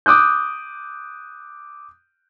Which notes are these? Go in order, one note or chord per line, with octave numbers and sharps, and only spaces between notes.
D6 D#6 F#6 G6